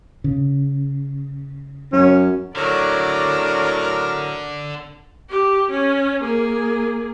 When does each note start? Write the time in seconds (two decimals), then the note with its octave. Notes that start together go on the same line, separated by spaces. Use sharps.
0.24 C#3
1.93 F#2 C#4
2.56 A2 D3 F#3 D4 A#4 D5
5.29 G4
5.71 C#4
6.21 A#3 G#4